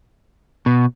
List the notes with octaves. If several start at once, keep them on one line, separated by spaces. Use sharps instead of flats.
B2